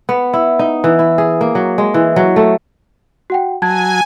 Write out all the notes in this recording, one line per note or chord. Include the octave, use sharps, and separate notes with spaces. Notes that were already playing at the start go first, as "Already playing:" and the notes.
B3
E4
D#4
E3
E4
G#4
A#3
F#3
G#3
E3
F#3
A3
F#4 F#5 G5
F#3 G#5 A5 G#6